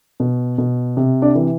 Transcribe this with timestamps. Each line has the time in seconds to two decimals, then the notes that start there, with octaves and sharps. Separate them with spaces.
0.20 B2
0.58 B2
0.97 C3
1.22 D4 D5
1.35 E3